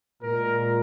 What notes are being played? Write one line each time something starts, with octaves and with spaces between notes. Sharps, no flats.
A#2 G#3 A#4